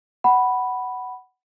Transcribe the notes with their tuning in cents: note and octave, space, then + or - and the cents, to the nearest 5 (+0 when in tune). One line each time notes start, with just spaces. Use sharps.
F#5 +15 B5 +0